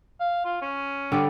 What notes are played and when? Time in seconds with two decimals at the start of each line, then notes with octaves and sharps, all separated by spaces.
0.20 F5
0.45 F4
0.62 C#4
1.12 D3 G3 D5